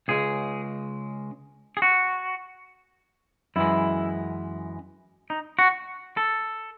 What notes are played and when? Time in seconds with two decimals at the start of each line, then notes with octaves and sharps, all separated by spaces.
0.08 C#2 C#3 G#3 G#4
1.77 G#4
1.82 F#4
3.56 F#2 E3 G#3 E4
5.30 D#4
5.59 F#4
6.17 A4